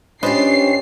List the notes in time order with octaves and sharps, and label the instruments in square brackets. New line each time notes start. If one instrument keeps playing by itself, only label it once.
[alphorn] C#4 [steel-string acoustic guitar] D4 F4 G4 [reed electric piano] B4 C5 D#5 [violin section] C7